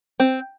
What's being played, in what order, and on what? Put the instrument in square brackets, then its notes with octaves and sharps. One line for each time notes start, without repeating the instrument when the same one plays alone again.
[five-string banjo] C4